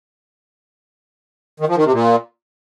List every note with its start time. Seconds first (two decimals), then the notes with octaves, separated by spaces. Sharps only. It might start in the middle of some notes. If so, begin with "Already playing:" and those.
1.60 D#3
1.68 F3
1.76 D#3
1.84 C3
1.93 A#2